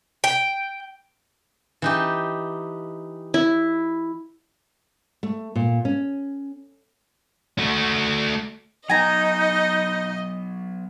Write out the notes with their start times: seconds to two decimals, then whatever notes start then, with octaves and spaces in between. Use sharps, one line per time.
0.24 G5
1.82 E3 D#4 G4
3.34 E4
5.23 A3
5.55 A#2
5.85 C#4
7.59 A3 F#4
8.89 F#3 B3 D#4 D#5 G#5 A#5